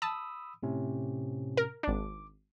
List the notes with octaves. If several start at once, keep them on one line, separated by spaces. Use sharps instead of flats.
A5 B5 D#6 E6
A2 C3 C#4
A#4
G#1 D4 D6